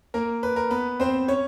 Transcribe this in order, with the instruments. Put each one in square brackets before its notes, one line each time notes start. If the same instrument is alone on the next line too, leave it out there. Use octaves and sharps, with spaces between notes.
[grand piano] A#3 A#4
B4
A#4
B3 B4
C4 C5
C#4 C#5